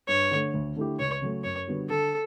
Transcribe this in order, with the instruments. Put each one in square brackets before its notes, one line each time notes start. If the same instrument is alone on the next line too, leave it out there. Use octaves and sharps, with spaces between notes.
[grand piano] G2 [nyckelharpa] C#5
[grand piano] D3 A3
D2
D3 A3 E4 G4
[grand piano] C#2 [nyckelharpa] C#5
[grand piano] C#3 F#3 A3
[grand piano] F#2 [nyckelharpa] C#5
[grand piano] D3 G3 B3 F#4
[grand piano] D3 [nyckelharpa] A4